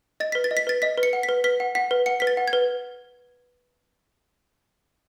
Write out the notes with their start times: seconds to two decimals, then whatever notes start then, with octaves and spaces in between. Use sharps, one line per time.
0.20 D#5 A6
0.32 B4 B6
0.44 A6
0.51 D#5
0.57 B6
0.67 B4 A6
0.82 D#5 B6
0.98 B4
1.03 C#7
1.13 F#5
1.23 B6
1.29 B4
1.44 B4 B6
1.60 F#5
1.75 F#5 B6
1.91 B4
2.06 F#5 C#7
2.20 B4 B6
2.27 A6
2.37 F#5
2.48 G#6
2.53 B4